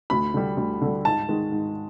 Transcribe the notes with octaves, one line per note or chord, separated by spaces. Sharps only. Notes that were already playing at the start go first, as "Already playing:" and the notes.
D2 B5
D3 G3
D2
D3
G3
G#2 A5
D#3 G#3
G#2